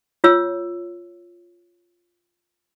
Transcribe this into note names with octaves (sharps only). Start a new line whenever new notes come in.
F4 C#5 E6